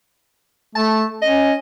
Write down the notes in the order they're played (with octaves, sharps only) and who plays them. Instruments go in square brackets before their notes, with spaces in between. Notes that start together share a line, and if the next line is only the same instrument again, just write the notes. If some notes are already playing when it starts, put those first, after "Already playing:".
[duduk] A3 [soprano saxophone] A5
[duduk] C#4 [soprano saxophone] D#5